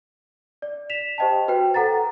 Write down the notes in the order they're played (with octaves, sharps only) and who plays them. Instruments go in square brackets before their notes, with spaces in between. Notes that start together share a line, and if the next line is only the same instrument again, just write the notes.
[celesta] D5
B6 E7 F7
G4 C5 D#5 G5 A5
F#4 B4 C5 G5
A4 F#5 A#5 A6